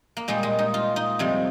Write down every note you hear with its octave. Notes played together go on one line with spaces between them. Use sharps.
A#3
A#2 G3 G#3
G#3
D#4
F4
D#4
F2 C3 G3